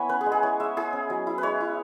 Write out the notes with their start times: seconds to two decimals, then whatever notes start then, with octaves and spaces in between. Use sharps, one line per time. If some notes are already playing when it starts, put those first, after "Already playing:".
Already playing: B3 E4 C#5 F#5 G#5 B5
0.09 C#4 B4
0.21 G#4
0.26 G#3
0.32 G#4
0.43 E4 C#5
0.60 G#3 E5
0.77 E4 G#4
0.93 C#4
1.10 F#3
1.27 E4
1.38 B4
1.43 G#3 C#5
1.60 E4